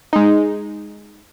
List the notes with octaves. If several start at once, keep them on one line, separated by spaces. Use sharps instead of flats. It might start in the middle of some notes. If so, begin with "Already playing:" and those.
G#3 D#4